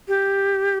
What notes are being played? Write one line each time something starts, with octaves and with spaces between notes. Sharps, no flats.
G4